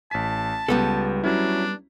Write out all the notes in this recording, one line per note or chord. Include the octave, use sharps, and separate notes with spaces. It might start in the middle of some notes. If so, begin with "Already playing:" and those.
A1 A5 B6
C#2 G3 B3 A4
F#3 C#4 D4 E4